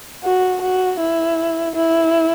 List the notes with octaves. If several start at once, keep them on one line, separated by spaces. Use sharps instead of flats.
F#4
F#4
E4
E4